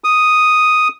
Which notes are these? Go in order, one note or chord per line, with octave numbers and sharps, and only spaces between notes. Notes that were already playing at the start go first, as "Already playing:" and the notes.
D#6